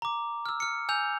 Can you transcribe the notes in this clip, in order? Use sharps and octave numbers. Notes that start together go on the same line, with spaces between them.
A#5 D6
E6 F6
F6 C#7
G#5 E6 G6 F7